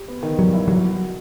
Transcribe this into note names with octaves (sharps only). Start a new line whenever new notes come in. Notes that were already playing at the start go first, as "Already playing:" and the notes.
Already playing: G4
B3
D#3
F#3 G3
E4
F#3 F#4